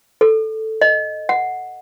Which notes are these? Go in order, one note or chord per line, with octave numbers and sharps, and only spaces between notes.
A4
D#5
F#5